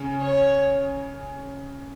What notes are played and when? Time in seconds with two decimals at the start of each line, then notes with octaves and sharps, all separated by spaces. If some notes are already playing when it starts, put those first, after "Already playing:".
Already playing: C#3 C#4
0.21 C#5